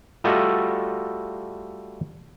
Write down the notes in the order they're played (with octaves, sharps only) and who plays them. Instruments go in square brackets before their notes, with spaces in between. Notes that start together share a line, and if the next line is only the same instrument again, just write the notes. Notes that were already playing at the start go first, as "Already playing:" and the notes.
[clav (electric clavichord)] G3 A3 F4 F#4 A4 D#5